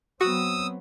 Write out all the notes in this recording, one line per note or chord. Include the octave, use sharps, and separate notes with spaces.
F#3 B3 C4 F#4 D#6 E6